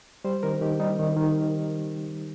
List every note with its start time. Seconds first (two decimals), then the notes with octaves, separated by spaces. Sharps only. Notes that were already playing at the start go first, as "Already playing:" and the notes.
0.24 G3 C5
0.43 D#3 A#4
0.61 D#3 G4
0.80 G3 D#4
0.99 D#3
1.17 D#3